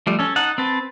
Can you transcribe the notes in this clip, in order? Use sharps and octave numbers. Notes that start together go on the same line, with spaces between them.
F3 G3 A3
C#4 A4
D#4 F#5 A5
C4 B4 A5